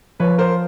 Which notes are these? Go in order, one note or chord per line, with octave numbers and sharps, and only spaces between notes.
F3 B4 C#5
A#4 C5